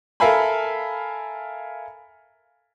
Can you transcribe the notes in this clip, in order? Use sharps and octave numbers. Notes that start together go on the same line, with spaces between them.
A4 A#4 E5 F5 G#5 B5